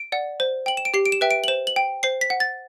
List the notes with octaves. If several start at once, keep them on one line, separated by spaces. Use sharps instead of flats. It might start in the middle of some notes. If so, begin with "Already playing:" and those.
Already playing: D7
D5 F#5
C5
G5 F#7
E7
D7
G4 C7
D7
E7
B4 E5 G5
D7
F#7
C5 E7
F#7
G5
C5 C7
B6
F#5
A6